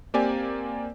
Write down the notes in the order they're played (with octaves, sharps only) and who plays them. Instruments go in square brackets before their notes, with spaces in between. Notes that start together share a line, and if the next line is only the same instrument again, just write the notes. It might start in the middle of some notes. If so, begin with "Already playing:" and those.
[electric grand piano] A#3 C4 G4 D5 G#5